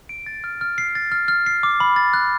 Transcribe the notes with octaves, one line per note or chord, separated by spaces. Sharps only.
D7
A6
F6
F6
C7
A6
F6
F6
C7
D6
B5
A6
F#6